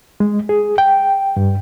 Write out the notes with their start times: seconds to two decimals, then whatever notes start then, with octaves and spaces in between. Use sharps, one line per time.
0.20 G#3
0.49 G#4
0.78 G5
1.37 G2